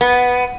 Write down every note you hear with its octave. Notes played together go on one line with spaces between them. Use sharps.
B3